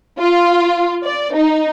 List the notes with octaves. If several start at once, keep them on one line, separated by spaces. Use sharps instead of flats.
F4
D5
D#4